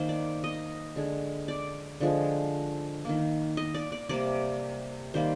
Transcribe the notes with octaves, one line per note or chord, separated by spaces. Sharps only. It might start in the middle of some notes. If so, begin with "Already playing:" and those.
Already playing: D#3 A#3 C5
D5
D#5
D3 G#3
D5
D3 F3 G#3
D#3 A#3
D#5
D5
D5
C3 G3 A#3 D5
D#3 G3 A#3 C5